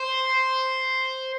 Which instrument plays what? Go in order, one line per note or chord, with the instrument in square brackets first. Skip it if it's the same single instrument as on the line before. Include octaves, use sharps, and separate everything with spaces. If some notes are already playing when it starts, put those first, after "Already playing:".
Already playing: [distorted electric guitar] C5